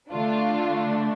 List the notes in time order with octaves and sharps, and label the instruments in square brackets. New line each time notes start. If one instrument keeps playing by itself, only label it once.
[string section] D3 A3 D4 F4